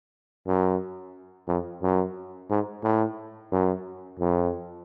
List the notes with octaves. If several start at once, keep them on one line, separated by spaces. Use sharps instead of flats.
F#2
F2
F#2
G#2
A2
F#2
F2